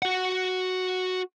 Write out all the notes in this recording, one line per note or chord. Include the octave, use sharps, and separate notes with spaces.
F#4 F#5